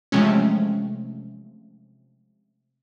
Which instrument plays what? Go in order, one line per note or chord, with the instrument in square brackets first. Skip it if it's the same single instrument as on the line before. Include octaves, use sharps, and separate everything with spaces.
[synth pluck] C3 E3 F3 G#3 A3 C#4